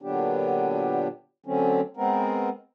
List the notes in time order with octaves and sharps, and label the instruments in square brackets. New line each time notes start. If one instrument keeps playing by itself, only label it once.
[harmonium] A#2 D3 F#3 B3 D4 G4
D3 F#3 A3 C4 C#4
G#3 B3 C4 A#4